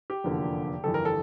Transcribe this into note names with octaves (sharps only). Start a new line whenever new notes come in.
G4
F1 E2 D3 F3 A#3
G1 F2 E3 G3 A4
A#4
A4